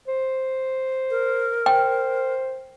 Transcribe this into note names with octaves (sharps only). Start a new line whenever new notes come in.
C5
A#4
C5 G5